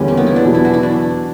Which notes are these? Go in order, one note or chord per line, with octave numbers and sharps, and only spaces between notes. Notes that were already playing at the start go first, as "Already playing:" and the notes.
Already playing: E2 D3 G3 C#4 E4 F#4
A#3
B3
E4
D4
E2 B2 F#3
E4
F#4
E4
D4